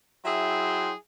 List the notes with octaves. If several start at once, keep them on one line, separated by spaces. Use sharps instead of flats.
F#3 E4 G#4 E5 G5 C6